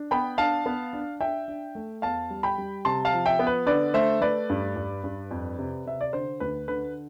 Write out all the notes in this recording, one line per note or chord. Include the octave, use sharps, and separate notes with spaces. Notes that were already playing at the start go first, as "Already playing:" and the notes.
Already playing: D4
B3 G5 B5
D4 F5 A5
B3
D4
D4 E5 G5
D4
A3
E2 F5 A5
G3
G5 B5
G3
C3 A5 C6
F5 A5
F3
E5 G5
B3
B4
D3 B4 D5
A3 C5 E5
A3 B4 D5
G2
G2
G2
F2
C3
C3 E5
D5
D3 C5
D2 B4
D3 B4